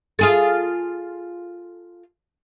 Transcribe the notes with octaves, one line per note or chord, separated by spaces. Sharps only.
F4 G#4 A4